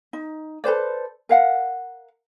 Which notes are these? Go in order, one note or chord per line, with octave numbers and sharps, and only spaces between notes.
D#4
A4 B4 C5 D5
A#4 F5 F#5